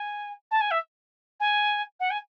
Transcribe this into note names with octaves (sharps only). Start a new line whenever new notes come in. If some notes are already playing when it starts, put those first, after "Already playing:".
Already playing: G#5
A5
G#5
E5
G#5
F#5
G#5